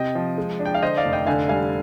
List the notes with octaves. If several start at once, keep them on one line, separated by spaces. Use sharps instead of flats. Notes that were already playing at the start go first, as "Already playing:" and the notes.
Already playing: C3 D#5 G5
F3
G#3
D4
G5
F5
D3 C5 D#5
D5 F5
F1
D#5 G5
D3 F5 G#5
G3 F5 G#5